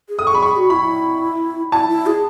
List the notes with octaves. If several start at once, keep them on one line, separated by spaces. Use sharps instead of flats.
G#4
A4 D#6
C#6
G#4 B5
G#4 C#6
F#4
E4 B5
E4 A5
E4
G#4